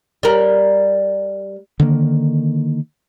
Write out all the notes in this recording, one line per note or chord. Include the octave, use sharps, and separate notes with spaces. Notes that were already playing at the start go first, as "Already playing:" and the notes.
G3 A#4
D3 D#3 A#3